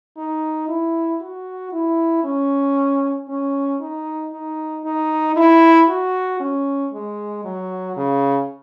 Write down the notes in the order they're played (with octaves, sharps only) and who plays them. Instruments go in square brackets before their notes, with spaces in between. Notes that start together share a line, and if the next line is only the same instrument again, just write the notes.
[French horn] D#4
E4
F#4
E4
C#4
C#4
D#4
D#4
D#4
E4
F#4
C#4
G#3
F#3
C#3